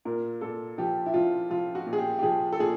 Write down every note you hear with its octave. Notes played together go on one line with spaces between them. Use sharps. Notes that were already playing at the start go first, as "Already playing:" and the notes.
A#2 A#4
A#2 A4
F3 G4
E4
F3 F4
F3 F4
F#4
A#2
G#4
G4
G4
F3 G#4
A4
A#2 G#4